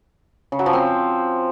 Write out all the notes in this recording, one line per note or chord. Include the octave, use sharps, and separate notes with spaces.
C#3
F#3
F3
C4